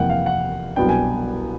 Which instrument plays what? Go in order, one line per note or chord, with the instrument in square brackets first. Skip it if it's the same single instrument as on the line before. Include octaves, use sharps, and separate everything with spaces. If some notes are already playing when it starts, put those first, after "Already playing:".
Already playing: [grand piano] F2 C3 E3 G3 A#3 F#5 G5
F5
F#5
C2 B2 F#3 B3 D4 G5
G#5